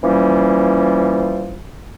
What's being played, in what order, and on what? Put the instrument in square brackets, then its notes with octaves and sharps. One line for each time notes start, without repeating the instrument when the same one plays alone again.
[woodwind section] E3 F3 G3 A#3 C#4